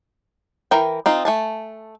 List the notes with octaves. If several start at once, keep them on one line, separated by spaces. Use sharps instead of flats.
E3 A#4 G5
C4 D#4 F4
A3 G#5 A5